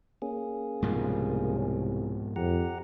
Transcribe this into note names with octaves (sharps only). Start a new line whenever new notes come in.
A#3 C#4 G#4
C2 G#2 B2 F3
F2 G4 F#5 A#5